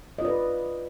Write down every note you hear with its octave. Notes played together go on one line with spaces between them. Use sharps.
F4 B4 D5 D#5